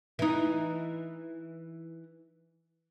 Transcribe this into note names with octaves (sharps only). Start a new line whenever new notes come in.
E3 D#4